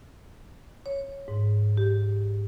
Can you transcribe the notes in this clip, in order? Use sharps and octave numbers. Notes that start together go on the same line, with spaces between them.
C#5
G#2
G4